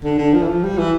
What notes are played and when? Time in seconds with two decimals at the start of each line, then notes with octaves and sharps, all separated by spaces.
0.04 D3
0.18 D3
0.34 F3
0.42 E3
0.48 F3
0.63 G3
0.78 E3